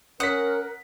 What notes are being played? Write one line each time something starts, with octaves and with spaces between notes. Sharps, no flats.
C#4 A#4 F#5 D#6 B6